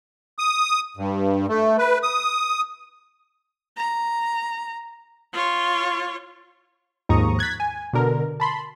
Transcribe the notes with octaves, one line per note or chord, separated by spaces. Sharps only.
D#6
G2
A3
B4
D#6
A#5
F4 C#5
D#2 G#2 F3 A#5 C#6 D#6
F#6 G#6 A6 B6
G#5
B2 D3 A#4
A5 B5 C6